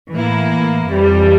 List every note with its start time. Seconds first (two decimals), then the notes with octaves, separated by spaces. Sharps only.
0.12 A2 E3 A#3 E4
0.91 F2 E3 G3